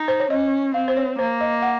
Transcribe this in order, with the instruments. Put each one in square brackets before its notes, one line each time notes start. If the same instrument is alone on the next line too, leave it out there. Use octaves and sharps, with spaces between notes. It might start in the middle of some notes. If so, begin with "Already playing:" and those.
Already playing: [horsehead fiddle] D#4
[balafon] C5
C#5
[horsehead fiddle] C#4 [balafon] D#5
[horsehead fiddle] C4 [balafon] F5
[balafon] C5
C#5
[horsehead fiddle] A#3 [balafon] C5
[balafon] D#5
F#5